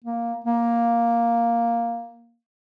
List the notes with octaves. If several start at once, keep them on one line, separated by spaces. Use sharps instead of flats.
A#3
A#3